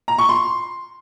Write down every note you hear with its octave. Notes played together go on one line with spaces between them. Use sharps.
A#5
C#6
C6